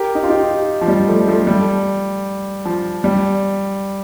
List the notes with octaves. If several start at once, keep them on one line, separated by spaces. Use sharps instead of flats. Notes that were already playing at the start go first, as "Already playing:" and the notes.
Already playing: G4 A#4
D#4
F4
D#4 G4
F3
G3
F3 A3
F3 A3
G3
F3
G3